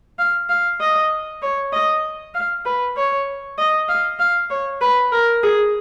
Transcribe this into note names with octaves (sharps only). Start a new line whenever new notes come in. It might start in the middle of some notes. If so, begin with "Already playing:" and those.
F5
F5
D#5
C#5
D#5
F5
B4
C#5
D#5
F5
F5
C#5
B4
A#4
G#4